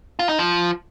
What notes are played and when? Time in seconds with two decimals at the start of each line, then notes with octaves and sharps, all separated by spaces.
0.19 F4
0.29 D#4
0.39 F3